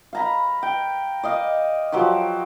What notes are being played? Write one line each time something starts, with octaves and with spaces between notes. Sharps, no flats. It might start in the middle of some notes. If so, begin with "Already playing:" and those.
F5 A#5 B5
G5
D5 D#5 F5
F3 F#3 G4 D5